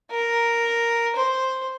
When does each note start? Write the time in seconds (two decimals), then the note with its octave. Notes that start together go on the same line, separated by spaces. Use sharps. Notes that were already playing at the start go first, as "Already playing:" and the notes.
0.11 A#4
1.16 C5